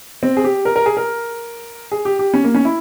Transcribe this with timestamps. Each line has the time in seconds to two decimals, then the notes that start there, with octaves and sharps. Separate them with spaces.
0.23 C4
0.37 G#4
0.44 G4
0.65 A#4
0.76 A#4
0.86 G#4
0.97 A#4
1.92 G#4
2.05 G4
2.19 G4
2.34 C#4
2.44 A#3
2.55 C#4
2.65 E4